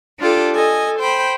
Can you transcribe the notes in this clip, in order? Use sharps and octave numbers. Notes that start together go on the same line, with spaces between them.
D4 F4 G4 A4
A4 D#5 G#5
C5 G5 B5